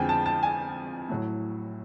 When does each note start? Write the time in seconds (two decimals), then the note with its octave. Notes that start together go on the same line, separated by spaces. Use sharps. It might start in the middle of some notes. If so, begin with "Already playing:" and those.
Already playing: F2 D3 F3 G#3 G5 G#5
0.09 A5
0.26 A5
0.43 G#5
1.09 A2 F#3 A3